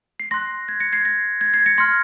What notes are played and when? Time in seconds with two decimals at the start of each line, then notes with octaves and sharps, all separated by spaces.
0.20 C7
0.31 C6 F#6 A#6
0.69 G#6
0.80 A#6 C#7
0.93 G#6 C7
1.05 A#6
1.41 G#6
1.54 G#6 C7
1.66 A#6 C#7
1.78 C6 F6 A#6 C#7